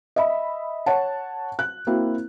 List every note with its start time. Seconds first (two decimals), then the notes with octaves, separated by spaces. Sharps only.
0.16 D#5 E5 B5
0.86 C#5 F#5 A5
1.59 F#6
1.87 A#3 C4 E4 F#4